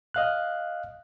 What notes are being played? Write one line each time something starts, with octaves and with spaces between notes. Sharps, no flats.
D#5 F5 F#6